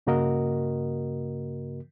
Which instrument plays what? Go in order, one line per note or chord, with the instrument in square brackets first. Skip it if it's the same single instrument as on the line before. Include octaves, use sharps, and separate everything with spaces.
[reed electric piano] G2 C#3 A#3 F#4 A#4 D#5